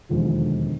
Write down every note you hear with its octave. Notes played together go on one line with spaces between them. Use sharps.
E1 D#2 D3 F3 G#3